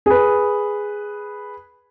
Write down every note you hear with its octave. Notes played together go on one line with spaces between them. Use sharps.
G#4 B4